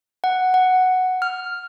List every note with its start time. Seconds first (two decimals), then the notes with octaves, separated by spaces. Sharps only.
0.24 F#5
0.54 F#5
1.22 F6